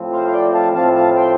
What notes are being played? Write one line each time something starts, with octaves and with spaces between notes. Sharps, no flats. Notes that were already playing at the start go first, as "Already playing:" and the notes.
Already playing: A2 F3 C4
C5 F5
F5
D5 G5
F5 A5
A2 F3 C4 F5 A5
F5 A5
G5 C6